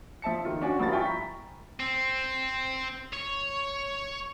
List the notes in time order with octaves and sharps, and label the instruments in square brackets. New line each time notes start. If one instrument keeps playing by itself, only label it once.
[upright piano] F3 E5 A5 C#7
D#3 F4
C#4 D4 F#4 D5 G#5
G2 F3 A#4 A6
E4 F4 G5 G#5 C#6
A#5 B5 B6
[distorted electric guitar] C4
C#5